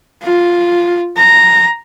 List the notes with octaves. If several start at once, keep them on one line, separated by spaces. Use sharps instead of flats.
F4
A#5